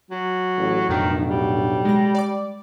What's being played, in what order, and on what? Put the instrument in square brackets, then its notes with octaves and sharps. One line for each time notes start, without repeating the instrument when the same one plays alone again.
[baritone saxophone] F#3
[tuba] A1
[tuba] B1 [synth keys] F2 A2 D4 [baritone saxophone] D#3
[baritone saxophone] G3
[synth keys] G#3 A#6
D5 D6